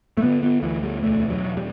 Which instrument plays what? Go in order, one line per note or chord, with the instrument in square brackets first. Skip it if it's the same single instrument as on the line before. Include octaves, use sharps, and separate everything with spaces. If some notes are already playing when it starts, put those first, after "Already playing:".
[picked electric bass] A3
D3 B3
B3
D2 E3
G3
E1 A3
F#3
E1
G3